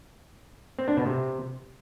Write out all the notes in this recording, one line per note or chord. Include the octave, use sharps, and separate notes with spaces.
C4
D4
B2
C3